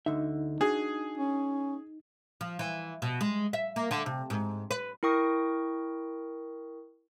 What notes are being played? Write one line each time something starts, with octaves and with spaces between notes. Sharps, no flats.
D2 D3 D#4 E5
D4 F#4 G#4
C#4
F3
E3
B2
G#3
E5
A#3
D3
C3
G#2
B4
E4 A#4 G5 C#6 D#6 A#6